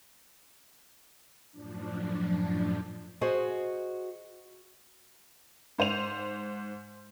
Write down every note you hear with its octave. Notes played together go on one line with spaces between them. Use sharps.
F#2 A2 F3 D4
F#4 G#4 C5 D#5
G#2 C5 D#7 F7